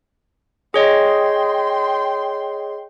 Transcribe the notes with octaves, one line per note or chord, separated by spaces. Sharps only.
G#4 C#5 D#5 G5 C6